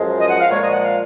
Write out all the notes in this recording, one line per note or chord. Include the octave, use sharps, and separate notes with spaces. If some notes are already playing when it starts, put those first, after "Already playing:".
Already playing: F#2 F3 G#3
D#5
F#5
F5
A#2 F3 G#3 C#5
D#5
F#5
F5